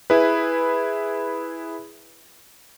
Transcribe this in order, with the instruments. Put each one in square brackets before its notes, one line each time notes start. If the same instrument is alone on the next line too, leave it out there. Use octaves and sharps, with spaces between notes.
[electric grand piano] E4 G#4 B4